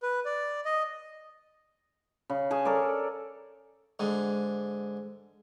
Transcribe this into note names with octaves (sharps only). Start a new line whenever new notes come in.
B4
D5
D#5
C#3
C#4 G#4 G#5 A5
A4 A#4 C#5 D5
G#2 D3